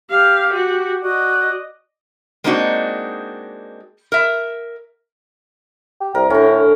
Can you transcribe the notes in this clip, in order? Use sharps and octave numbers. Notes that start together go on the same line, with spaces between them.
G4 F5
F#4
F#4 D5 D#5
G#3 A#3 C4 D4 D#4 F#4
A#4 E5
G4
C2 A#4
A2 D3 C#4